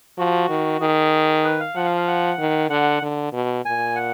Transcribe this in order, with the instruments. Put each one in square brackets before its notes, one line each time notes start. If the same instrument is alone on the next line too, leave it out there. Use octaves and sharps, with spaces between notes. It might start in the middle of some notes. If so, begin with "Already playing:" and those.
[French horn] F3 [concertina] F#4
[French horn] D#3
[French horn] D#3 [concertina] G#4
[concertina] B4
F5
[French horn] F3 [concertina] F#5
[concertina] F5
F5
F#5
[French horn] D#3
[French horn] D3 [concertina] F#5
[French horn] D3
B2
[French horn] A#2 [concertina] G#5
[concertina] F#5